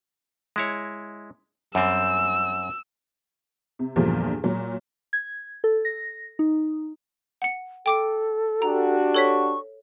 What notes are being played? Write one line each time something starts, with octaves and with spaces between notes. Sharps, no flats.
G#3 E4 C#5
F#2 G3 C4 E6
C3
E2 G2 A#2 D3 F3
A#2 F#3
G#6
A4
A#6
D#4
F#5 C#7
A4 G5 D6 D7
D4 F#4 G4 A#5
A4 C#5 C#6 B6